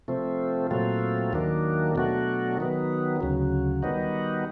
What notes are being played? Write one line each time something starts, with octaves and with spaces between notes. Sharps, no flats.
C3 F3 A3 C4
A#2 F#3 A3 C4 F4
D#2 D#3 F#3 A#3 D4
B2 F#3 A3 D4 F#4
D#3 F#3 B3
D2 C#3 F#3
D#3 G3 B3 D#4 F#4